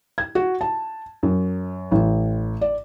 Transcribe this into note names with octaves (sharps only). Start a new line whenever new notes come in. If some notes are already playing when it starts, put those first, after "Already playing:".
G#6
F#4
A5
F#2
A1
D5